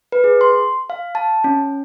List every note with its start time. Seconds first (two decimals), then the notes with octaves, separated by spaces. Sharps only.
0.12 B4
0.24 G#4
0.41 C6
0.90 F5
1.15 A5
1.44 C#4